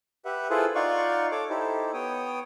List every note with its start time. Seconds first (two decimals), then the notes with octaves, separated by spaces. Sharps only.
0.25 G4 B4 E5 F#5
0.50 E4 F4 G#4 A4 B4 C5
0.75 D#4 F4 D5 F5 F#5 C#6
1.32 A4 C#5 D6
1.50 D#4 E4 G4 A4 C5
1.94 B3 C#5 G5 D#6